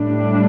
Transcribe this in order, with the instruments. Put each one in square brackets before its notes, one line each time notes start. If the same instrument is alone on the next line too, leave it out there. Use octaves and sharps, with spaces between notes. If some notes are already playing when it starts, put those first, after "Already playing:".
Already playing: [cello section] A2 G3 D4